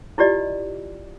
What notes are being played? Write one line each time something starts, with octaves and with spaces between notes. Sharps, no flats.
E4 F4 G4 D5 D#5